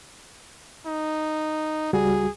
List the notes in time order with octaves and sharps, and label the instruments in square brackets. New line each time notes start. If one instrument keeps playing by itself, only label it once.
[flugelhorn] D#4
[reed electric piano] C#2 G3 F#4 [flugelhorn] G#4